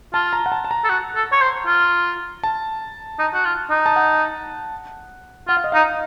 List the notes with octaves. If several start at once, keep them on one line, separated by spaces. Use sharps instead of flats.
F4 A5
A#5
F#5
A5
A5
A#5
A4
F#4
A4
C#5
C5
F4
A5
D#4
F#4
F4
D#4
A5
F#5
F4 F#5
F5
D#5
D#4 F5